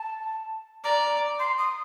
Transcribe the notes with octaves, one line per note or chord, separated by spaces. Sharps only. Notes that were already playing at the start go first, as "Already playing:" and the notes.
Already playing: A5
D5 A#5
C6
D#6